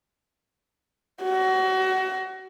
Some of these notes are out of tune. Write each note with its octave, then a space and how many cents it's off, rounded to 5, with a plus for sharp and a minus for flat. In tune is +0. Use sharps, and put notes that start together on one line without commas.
F#4 +30